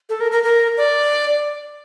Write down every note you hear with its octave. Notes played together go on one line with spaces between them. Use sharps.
A4
A#4
A#4
A#4
D5